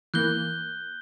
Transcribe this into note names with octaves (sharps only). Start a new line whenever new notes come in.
E3 A#3 F#6 G6 G7